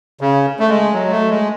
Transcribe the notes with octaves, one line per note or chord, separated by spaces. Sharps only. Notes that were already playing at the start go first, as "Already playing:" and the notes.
C#3
A3
G#3
F#3
A3
G#3